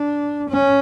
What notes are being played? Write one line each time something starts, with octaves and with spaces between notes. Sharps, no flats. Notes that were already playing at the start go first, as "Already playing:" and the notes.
Already playing: D4
C#4